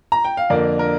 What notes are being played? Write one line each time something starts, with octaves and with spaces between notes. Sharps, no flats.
A#5
G5
F5
F2 D3 A#3 D4 A#4 D5
A#4